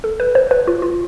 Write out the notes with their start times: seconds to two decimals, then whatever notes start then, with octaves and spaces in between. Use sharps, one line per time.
0.04 A4
0.20 B4
0.35 C5
0.51 B4
0.67 F4
0.82 F4